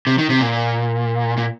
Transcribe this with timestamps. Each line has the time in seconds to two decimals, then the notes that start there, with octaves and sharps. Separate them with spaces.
0.07 C3
0.18 D#3
0.30 C3
0.41 A#2
1.38 A#2